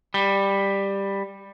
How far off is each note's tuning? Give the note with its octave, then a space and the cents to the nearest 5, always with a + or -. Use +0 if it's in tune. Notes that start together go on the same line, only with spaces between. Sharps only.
G3 +10